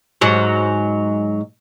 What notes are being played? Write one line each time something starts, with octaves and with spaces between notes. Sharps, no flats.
G#2 F#3